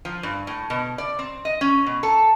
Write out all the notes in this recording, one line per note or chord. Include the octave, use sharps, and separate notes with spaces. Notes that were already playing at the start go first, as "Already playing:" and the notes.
F3
G2
A2
B2
D5
C4
D#5
C#4
B2
A4